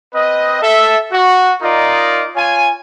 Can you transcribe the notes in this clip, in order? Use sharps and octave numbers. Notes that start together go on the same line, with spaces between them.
C4 B4 D#5
A4 E5
F#4
D#4 F4 A#4 D5 D#5
F4 C#5 G#5